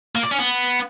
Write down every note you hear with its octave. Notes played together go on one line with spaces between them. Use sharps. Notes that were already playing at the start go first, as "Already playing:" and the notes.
A#3
D5
C#4
B3